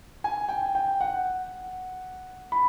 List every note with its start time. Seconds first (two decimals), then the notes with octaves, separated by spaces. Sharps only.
0.24 G#5
0.49 G5
0.75 G5
1.01 F#5
2.52 B5